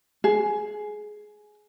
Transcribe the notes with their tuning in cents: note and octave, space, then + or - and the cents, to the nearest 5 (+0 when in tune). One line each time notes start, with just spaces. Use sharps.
G#4 +15